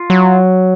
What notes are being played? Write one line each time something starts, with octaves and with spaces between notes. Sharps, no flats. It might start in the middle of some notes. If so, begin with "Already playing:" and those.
Already playing: F4
F#3